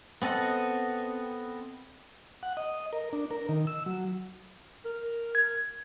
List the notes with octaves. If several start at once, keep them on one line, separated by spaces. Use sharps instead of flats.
B3 C4 A4 D#5 F#5
F#5
D#5
A#4
D4
A#4
D#3
E6
F#3
A#4
G#6